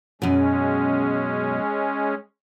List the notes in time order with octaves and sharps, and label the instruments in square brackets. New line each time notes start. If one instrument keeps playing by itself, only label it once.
[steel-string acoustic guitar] F#2 B2 [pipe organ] G#3 C#4